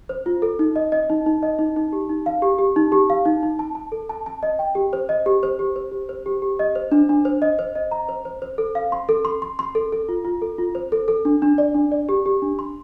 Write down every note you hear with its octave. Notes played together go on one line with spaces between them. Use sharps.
C5
F4
A4
D#4
D#5
D#5
D#4
D#4
D#5
D#4
D#4
G4
D#4
F5
G4
G4
D#4
G4
F5
D#4
D#4
A5
A5
A4
A5
A5
D#5
G5
G4
C5
D#5
G4
C5
G4
C5
G4
C5
G4
G4
D#5
C5
D4
D4
C5
D#5
C5
D#5
A#5
C5
C5
C5
A4
F5
C6
A4
C6
C6
C6
A4
A4
F4
F4
A4
F4
C5
A4
A4
D4
D4
D5
D4
D5
G4
G4
D4
C6